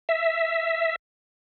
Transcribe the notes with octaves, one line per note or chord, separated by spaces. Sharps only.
E5